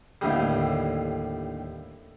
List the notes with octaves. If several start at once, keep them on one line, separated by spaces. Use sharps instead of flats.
D#2 A2 D3 G3